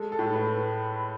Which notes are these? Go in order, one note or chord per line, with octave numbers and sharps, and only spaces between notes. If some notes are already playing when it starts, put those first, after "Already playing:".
Already playing: G#3 A4
A4
A2
B4